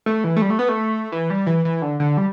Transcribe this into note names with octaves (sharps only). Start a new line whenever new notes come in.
A3
E3
A3
G3
A3
B3
A3
E3
G3
E3
E3
D3
D3
G3